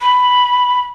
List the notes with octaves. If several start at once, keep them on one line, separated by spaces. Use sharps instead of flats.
B5